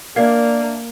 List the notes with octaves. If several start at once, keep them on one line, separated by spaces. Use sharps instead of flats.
A#3 D4 A#4 D5 E5 F5 G#6